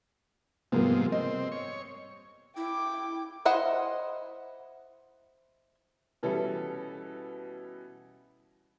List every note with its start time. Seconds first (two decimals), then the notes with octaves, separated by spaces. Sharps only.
0.72 G#2 C3 F3 G3 A#3 B3
1.12 C4 D#5
1.52 C#5
2.57 E4 G5 D6
3.45 E4 C5 D#5 F#5
6.23 B2 E3 G3 C#4 E4 A4